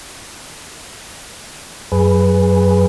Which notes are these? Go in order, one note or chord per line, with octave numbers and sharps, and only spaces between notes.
F#2 G#4 B4